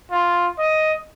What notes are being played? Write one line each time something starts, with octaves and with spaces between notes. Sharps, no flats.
F4
D#5